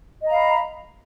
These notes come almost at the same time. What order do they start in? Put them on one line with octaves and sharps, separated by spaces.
D#5 A#5 F5 B5